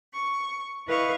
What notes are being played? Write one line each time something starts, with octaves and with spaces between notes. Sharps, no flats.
C#6
E4 B4 D#5 F5 C#6